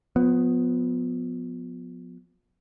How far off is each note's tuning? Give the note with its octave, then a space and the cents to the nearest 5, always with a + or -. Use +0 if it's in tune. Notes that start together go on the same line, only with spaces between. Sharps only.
F3 +35 B3 +5